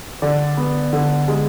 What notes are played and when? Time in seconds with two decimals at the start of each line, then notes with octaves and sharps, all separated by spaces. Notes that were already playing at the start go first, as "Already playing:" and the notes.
0.22 D3 D5
0.57 B3
0.93 D3
1.28 G#3